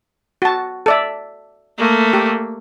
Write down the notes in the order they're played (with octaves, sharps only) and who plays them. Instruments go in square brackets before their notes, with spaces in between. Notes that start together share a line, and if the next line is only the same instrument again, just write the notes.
[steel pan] F#4 A5
A4 D5 E5
[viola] A3 A#3
[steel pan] G4